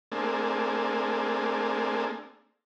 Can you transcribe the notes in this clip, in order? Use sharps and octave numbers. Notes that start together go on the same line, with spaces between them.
A3 A#3 C4 D4 G#4